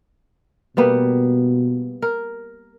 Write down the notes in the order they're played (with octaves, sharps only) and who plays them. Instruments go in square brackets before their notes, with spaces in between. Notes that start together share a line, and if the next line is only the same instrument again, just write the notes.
[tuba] B2 [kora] G3 A#3 B3
[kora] A#4